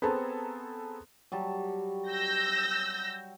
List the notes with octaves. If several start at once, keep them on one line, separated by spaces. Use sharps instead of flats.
B3 C4 G#4 A4 A5 A#5
F#3 G3 A5
E6 G6 A#6